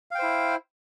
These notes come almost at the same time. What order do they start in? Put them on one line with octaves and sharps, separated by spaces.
F5 G5 C5 E4